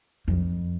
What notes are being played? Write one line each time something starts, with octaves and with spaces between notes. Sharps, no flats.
F2